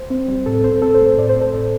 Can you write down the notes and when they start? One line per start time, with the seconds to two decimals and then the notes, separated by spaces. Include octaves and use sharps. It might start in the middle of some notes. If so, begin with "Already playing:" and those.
Already playing: C5
0.10 C4
0.28 G3
0.46 A2 A4
0.64 C4 C5
0.82 C4 A4
0.94 C5
1.00 A3
1.07 C5
1.17 A2 D5
1.29 C5
1.36 C4
1.41 A4
1.53 A2